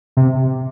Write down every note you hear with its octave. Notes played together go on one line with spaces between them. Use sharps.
C3